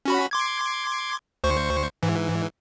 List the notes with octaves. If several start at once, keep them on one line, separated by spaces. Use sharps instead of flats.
C#4 F#4 B5
C6 D6 G#6
D2 C5 C#6
G#2 E3